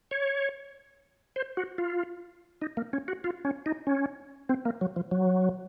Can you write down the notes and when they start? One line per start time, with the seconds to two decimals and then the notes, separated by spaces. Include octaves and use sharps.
0.11 C#5
1.36 C5
1.57 F#4
1.78 F4
2.62 D#4
2.77 A#3
2.93 C#4
3.08 F#4
3.24 F4
3.45 C#4
3.66 D#4
3.87 C#4
4.49 C4
4.65 A#3
4.81 F#3
4.96 F3
5.11 F#3